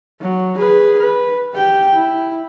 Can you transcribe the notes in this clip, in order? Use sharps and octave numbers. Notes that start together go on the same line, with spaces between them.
F#3
G#4 B4
B4
G4 G5
E4